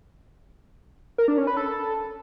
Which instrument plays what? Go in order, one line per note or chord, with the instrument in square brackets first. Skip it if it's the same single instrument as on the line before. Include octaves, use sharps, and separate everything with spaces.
[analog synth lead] A#4
D4
C#4
B4
A4